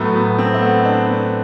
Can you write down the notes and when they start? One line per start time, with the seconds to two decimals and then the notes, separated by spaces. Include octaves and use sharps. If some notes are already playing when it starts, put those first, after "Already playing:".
Already playing: A2 F#3 A3 B3
0.16 B3
0.38 C4
0.54 A3
0.62 B3
0.84 D4
1.06 B3